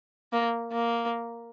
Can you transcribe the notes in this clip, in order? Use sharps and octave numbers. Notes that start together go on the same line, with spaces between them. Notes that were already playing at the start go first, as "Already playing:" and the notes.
A#3
A#3